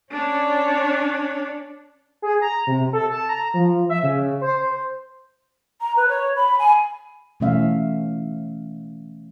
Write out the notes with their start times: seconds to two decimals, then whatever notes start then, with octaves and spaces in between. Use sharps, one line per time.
0.11 C#4 D4 C#5 D5
2.22 G#4
2.41 A#5
2.67 C3
2.93 A4
3.11 A5
3.29 A#5
3.54 F3
3.89 E5
4.03 C#3
4.41 C5
5.81 A#5
5.97 B4
6.09 C#5
6.36 B5
6.59 G#5
7.40 B2 E3 A3 C#4 E5 F5